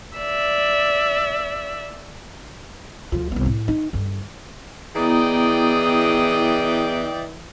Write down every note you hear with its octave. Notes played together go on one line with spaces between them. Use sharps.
D5 E5
D2 F3
C2 B3
A2
D#4
G2 D3
E3 B3 E4 G#4 D5 D#5 G5 A#5